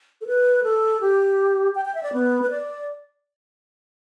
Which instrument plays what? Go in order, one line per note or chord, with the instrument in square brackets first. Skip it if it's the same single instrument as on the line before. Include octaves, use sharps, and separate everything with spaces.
[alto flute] A4
B4
A4
G4
G5
G5
E5
D5
B3
B4
D5